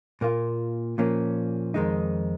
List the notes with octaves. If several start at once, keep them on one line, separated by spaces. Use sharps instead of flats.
A#2 A#3 F4
A#2 F3 A#3 C#4
F2 D#3 G#3 D#4